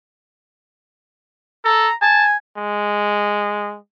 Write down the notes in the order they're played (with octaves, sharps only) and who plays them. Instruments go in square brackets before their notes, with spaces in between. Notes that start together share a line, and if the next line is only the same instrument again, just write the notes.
[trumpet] A4 [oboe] A#5
[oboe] G#5 [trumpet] A5
[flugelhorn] G#3